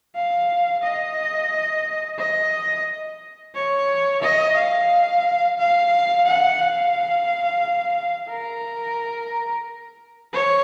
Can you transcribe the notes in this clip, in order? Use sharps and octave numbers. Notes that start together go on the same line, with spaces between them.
F5
D#5
D#5
C#5
D#5
F5
F5
F#5
F5
A#4
C#5